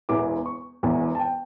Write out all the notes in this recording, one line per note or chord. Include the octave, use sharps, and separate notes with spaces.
E1 E2 E3 D6
C#6
E1 E2 E3
A5
G5